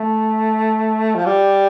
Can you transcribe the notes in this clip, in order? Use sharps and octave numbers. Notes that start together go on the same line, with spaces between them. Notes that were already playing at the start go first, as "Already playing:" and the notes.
Already playing: A3
F3
G3